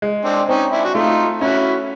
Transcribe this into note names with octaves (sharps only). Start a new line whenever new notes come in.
G#3
C4 D4
C4 C#4 D#4
D4 E4
F#4
A3 D#4 F4
C#4 E4 F#4